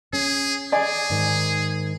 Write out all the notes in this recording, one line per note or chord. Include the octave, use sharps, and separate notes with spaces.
C#4 G#4
G#4 D5 G#5
G#2 D#3